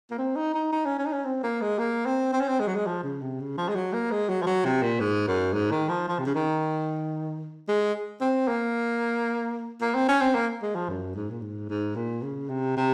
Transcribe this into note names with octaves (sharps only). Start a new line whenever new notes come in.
A#3
C4
D#4
D#4
D#4
C#4
C#4
D#4
C#4
C4
A#3
G#3
A#3
C4
C4
C#4
C4
G#3
F#3
G#3
F3
C#3
C3
C#3
F3
G#3
F#3
A#3
G#3
F#3
F3
F#3
C3
A#2
G#2
F#2
G#2
D#3
F3
F3
C3
C#3
D#3
G#3
C4
A#3
A#3
C4
C#4
C4
A#3
G#3
F3
F#2
G#2
A#2
G#2
G#2
A#2
C#3
C3
C3